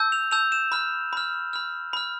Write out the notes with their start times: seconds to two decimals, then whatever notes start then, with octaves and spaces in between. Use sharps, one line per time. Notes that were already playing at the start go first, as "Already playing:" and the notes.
Already playing: A5 E6 G6
0.12 F7
0.31 A5 E6 G6 F7
0.52 E7
0.72 B5 F6
1.13 B5 F6
1.53 B5 F6
1.93 B5 F6